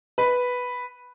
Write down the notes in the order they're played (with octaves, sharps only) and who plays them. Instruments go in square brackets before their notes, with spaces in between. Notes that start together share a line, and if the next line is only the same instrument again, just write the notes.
[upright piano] B4